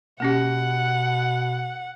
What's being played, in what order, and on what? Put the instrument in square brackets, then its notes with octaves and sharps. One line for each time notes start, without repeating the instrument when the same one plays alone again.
[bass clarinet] B2 [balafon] A#3 C#4 G4 [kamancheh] F#5